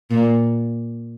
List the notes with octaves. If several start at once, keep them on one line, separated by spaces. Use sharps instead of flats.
A#2